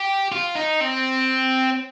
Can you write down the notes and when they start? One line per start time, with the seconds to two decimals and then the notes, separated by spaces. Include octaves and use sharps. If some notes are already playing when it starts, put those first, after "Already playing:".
Already playing: G4
0.32 F4
0.56 D#4
0.81 C4